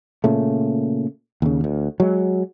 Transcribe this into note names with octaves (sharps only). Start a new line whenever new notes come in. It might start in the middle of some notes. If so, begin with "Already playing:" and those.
A#2 C#3 A3
D#2 C#3
D2
F#3 G#3